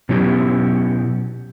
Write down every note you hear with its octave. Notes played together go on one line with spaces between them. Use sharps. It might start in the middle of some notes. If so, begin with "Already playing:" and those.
B2 F#3 B3 C#4 E4 G4